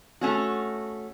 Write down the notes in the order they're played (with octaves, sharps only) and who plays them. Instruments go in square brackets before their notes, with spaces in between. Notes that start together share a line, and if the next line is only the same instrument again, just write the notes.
[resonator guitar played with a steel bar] A3 C#4 F#4